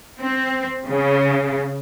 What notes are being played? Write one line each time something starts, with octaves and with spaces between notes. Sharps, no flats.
C4
C#3